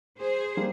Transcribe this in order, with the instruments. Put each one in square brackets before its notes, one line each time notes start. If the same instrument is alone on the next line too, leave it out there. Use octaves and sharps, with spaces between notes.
[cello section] G#4 C5
[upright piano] G3 A#3